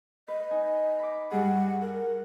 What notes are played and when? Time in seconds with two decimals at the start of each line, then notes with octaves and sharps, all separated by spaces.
0.28 B4 D#5
0.50 D#4 G#5
0.99 B5 D6
1.31 G2 G3 G#4 F#5
1.82 A#4 F#5